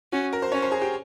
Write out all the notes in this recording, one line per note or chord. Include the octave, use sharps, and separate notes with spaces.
C#4 F#4
A#4
C5
C#4 C#5
C5
G#4
G4